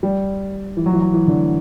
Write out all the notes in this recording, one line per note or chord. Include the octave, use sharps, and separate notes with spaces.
G3
E3
F#3
E3
F#3
E3
D3